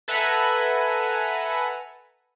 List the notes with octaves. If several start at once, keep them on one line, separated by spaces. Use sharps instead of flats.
A4 B4 E5 F#5 G#5 A#5